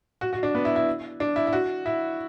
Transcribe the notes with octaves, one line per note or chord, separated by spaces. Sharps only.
F#4
F#4
D4
B3
E4
E4
D4
E4
E4
F#4
E4